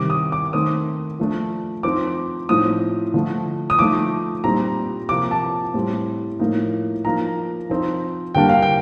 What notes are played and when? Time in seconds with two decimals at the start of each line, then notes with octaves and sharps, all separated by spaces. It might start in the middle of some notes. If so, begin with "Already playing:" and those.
Already playing: C3 D#3 G3 D6
0.10 D#6
0.32 D6
0.53 D#3 A3 C4 D#4 D#6
1.19 F3 A3 D4
1.83 F3 C4 D#4 D6
2.49 A2 F3 C4 D#4 D#6
3.14 D3 F3 A3
3.70 D#6
3.79 F3 A3 D#4 D6
4.44 A#2 G3 C4 D#4 A#5
5.09 C3 F3 A#3 D6
5.31 A5
5.74 A2 G3 C4
6.40 A2 F3 A#3 D#4
7.05 F3 A#3 D#4 A#5
7.69 F3 C4 D#4
8.35 D3 G3 A#3 D4 G5
8.49 F5
8.63 G5